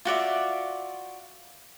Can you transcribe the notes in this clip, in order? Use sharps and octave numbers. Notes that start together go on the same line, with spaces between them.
F4 F#4 D5 E5